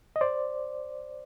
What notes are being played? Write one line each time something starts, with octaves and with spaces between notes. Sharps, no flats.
D#5
C5 D5